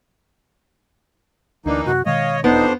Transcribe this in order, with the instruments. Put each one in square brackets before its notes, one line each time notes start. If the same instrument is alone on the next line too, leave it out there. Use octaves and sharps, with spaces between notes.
[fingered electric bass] D2 [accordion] E3 A#3 D#4 [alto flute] D4
[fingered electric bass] F#2 C3 [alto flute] F#4
[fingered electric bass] B2 D#3 G#3 [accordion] C#5 D#5 [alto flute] F5
[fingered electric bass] E1 [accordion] F2 D4 C5 [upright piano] B3 [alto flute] D#4